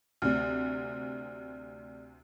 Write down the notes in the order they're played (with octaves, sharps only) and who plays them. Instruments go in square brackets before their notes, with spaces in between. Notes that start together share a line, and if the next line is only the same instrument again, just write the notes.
[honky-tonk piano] D2 C3 [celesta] D5 F6